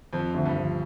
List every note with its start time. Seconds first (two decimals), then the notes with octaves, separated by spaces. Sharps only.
0.13 F2 F3
0.34 D2
0.46 G2
0.56 F3